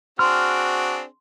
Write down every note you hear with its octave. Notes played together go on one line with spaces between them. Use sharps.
C4 D4 F#4 G#4 C6 F6